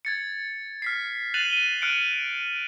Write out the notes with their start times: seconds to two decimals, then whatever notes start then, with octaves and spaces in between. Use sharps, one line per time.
0.05 G#6 A6 C#7
0.82 F6 B6 C7
1.34 F#6 A6 C7 D#7 F7 F#7
1.50 D#7 G7
1.82 F6 F#6 C#7 D7